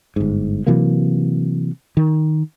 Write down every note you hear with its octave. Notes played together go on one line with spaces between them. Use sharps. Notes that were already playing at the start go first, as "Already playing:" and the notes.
G1 G#2
C3 E3 F#3 A#3
D#3